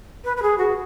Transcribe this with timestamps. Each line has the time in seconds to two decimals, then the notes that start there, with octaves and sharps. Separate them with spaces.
0.24 B4
0.37 B4
0.42 G#4
0.58 F#4